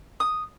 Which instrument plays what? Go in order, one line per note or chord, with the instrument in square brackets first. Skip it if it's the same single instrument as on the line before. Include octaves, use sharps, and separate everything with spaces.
[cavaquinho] D#6